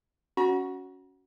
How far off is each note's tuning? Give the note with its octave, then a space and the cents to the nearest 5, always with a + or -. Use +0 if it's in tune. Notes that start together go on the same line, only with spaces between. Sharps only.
C#4 +5 F#4 +0 A#5 +45